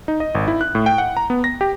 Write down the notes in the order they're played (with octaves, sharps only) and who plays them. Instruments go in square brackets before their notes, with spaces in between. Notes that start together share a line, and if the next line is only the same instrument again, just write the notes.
[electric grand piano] D#4
D#5
G#1
E4
F#6
A2
G5
F#5
A#5
B3
A#6
G4